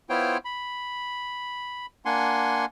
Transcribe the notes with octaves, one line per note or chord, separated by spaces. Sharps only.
B3 E4 F4 C5 C#5 G5
B5
A#3 D4 F#5 G#5 C6